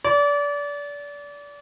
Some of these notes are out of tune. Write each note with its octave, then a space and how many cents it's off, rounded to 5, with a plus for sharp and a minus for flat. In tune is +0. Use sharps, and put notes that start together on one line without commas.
D5 -30